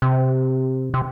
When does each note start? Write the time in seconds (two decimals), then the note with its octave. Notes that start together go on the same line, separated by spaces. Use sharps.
0.02 C3
0.94 C3